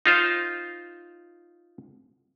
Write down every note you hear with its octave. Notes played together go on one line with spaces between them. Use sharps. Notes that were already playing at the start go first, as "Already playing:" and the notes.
D#4 F4 C5